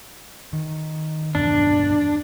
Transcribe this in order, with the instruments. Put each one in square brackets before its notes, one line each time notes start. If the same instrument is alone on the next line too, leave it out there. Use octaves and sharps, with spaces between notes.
[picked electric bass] D#3
[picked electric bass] E2 G2 B2 [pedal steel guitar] D4